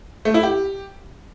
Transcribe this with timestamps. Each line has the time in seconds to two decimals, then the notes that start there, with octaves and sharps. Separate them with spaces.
0.25 A3
0.34 E4
0.43 G4